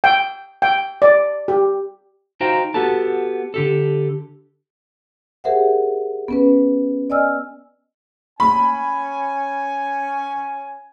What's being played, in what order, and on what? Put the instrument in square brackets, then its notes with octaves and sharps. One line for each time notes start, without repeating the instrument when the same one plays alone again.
[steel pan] G5
G5
D5
G4
[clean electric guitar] D#4 F#4 C5 F5 G5 A#5
B3 F#4 G4 A4 A5
D3 G4 A4
[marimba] G4 G#4 A#4 C5 E5 F#5
B3 C#4 B4
D5 D#5 G#5 E6 F6
[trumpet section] C#4 G#5 [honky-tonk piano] B5